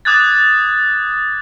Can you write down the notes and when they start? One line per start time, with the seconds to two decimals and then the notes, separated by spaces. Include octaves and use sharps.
0.05 D6 D#6 F#6 G#6 A6